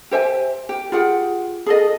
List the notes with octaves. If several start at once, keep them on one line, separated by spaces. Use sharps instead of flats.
G4 C5 E5 G#5
G4
F4 G4 G#4 F#5
G#4 A4 D#5